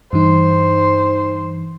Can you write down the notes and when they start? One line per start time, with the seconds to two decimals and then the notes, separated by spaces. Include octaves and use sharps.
0.13 G2 E3 D#4 C5